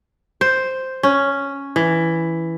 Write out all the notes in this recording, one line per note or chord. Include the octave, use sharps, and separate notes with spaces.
C5
C#4
E3